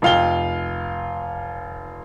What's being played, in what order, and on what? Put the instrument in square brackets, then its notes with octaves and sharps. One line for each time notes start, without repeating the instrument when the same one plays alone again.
[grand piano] F1 F4 F5 G5 G7